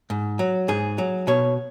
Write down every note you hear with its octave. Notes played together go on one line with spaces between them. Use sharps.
G#2
F#3
G#2 G#4
F#3
B2 C#5